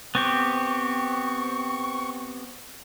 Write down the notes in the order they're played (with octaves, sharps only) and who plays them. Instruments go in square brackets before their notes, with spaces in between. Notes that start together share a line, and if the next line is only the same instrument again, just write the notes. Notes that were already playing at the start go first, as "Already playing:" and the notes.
[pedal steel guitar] B3 C4 G4 [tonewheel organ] C#6